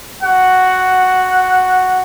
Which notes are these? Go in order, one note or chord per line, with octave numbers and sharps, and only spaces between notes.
F#4 F#5